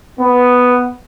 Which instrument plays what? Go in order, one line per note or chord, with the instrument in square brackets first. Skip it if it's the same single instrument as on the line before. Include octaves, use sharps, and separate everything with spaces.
[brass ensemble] B3